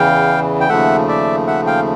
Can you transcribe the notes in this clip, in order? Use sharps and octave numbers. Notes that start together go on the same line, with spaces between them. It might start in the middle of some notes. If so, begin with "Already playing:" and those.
Already playing: E2 C#3 E3 F5 G5
G5
D#2 C#3 F3 A3 E5 F#5
D5 E5
E5 F#5
F5 G5